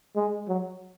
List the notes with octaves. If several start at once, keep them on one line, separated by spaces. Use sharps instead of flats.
G#3
F#3